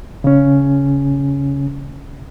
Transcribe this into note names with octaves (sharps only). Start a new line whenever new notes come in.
C#3 C#4